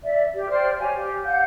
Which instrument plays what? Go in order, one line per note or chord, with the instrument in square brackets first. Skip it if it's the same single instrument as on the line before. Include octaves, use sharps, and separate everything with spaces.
[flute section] D5 E5
G4
C5 D5 G5 F6
G4 C#5 F5 G#5
G4
F5 F#5 G6